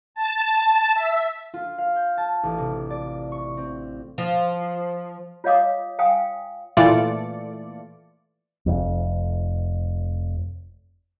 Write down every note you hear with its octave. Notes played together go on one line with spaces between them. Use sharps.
A5
E5
F4
F5
G6
A5
A1
C3
D5
C#6
C4
F3
F4 C#5 D#5 F5 D6 D#6
F5 G5 G#5 D#6
A#2 E3 A3 F4 D5 C#7
F1 F2